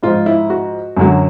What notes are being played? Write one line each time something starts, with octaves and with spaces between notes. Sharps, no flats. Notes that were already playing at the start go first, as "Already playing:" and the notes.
G#2 F3 F4
E4
F#4
F#2 D3 F#3